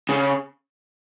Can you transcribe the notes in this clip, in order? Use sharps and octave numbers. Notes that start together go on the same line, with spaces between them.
C#3